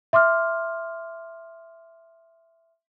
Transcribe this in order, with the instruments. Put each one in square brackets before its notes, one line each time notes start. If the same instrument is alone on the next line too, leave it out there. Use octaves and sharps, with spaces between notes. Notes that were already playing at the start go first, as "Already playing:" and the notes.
[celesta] E5 C6 D6 F6